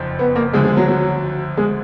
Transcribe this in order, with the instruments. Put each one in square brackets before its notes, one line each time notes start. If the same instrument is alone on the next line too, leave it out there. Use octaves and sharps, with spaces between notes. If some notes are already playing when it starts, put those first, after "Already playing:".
Already playing: [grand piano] F#1 F2 F3 D#4
[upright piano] B3
A#3
[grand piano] D2 D3 F3 [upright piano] G#3
[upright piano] G#3
F#3
F#3
G#3